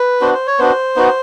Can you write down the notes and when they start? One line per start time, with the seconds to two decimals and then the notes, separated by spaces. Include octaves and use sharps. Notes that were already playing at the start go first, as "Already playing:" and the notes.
Already playing: B4
0.21 B3 D4 F#4 C5
0.34 C5
0.47 C#5
0.59 B3 D4 F#4 C5
0.96 B3 D#4 F#4